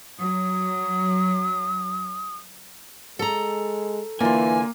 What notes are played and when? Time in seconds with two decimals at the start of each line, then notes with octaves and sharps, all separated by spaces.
0.20 F#3 D#6
3.19 G#3 A4 A#5
4.21 D3 E3 A#3 F4 G#5